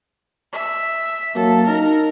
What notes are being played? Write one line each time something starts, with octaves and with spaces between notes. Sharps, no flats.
E5
F#2 F#3 A#3 A4
D#4 A#4